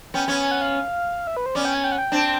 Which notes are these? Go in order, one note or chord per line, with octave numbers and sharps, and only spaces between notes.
B3 C#4 G5
B3 C#4 G#5
G#5
F#5
F5
E5
B4
C5
B3 C#4 D5
G5
G#5
G5
F#5
G5
C4 D4